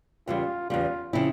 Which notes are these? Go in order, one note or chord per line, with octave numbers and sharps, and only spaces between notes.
E2 C#3 G3 F4
E2 C#3 G3 F4
C#3 F3 C4 E4